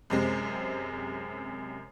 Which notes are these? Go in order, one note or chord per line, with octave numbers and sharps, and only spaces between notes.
F#2 C3 G#3 C4